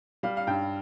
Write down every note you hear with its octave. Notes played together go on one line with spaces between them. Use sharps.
G3 F5
F5
G2 G5